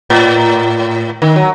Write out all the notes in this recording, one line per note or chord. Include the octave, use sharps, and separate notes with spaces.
A2
D#3
F#3